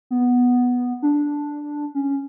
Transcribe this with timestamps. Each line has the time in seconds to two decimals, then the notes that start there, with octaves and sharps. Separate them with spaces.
0.11 B3
1.02 D4
1.95 C#4